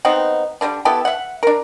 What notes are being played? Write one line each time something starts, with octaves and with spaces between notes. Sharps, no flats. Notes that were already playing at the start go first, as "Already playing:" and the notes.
B3 C4 D#4 F#5
D3 G3 A#3 D4
B3 E4 G4 A4
E5 F#5
D4 A#4